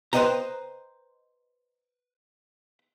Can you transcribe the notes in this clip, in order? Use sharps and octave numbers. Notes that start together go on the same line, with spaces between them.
B4 C5 D5 D#5 G5 A#5